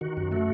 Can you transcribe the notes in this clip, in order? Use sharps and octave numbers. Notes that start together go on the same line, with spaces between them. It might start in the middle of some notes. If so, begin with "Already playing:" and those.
D#3 F#4
F#2 F#4
A3 F#4